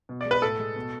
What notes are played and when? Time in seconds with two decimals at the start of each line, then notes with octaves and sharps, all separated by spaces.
0.09 B2
0.21 D5
0.25 G#3
0.31 B4
0.42 A2 A4
0.59 G#3
0.76 B2